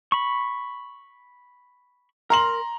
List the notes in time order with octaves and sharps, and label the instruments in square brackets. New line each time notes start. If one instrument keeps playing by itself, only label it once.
[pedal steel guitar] B5 C#6
[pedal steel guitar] A#4 [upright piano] A#5 C6 F#7